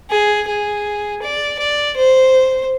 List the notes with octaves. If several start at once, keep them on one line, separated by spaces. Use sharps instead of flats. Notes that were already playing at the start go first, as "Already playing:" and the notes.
G#4
G#4
D5
D5
C5